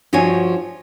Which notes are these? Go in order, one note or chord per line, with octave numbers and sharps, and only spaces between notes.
G2 F3 F#4 C#5 G#5